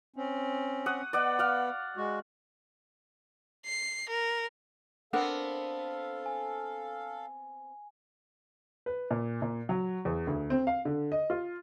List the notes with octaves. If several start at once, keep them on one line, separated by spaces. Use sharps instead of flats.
C4 C#4
F#5 C#6 D#6
B3 D5 D#5 F#5
D5 F5 F#5
G#3 F#4
C7
A#4
B3 C4 D4 A4 A#4 F5 F#5
G#5
B4
A#2
A#2
F#3
E2
D2
C4
F5
D3
D#5
F4